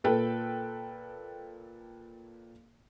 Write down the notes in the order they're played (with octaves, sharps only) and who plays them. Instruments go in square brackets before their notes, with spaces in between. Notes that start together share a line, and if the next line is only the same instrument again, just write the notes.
[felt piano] A#2 A4 B4 G5